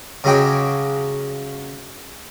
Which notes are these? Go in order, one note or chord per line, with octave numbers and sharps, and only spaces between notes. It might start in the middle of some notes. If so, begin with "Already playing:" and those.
C#3 F#3 G#3 G5 D6